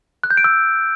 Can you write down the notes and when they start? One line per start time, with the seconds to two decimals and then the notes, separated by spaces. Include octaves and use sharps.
0.24 F#6
0.30 G6
0.37 D7
0.44 E6